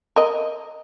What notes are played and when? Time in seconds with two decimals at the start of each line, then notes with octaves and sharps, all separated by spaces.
0.16 A#4 D#5